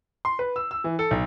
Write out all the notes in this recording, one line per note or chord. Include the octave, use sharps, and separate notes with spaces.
C6
B4
E6
E6
E3
A4
B1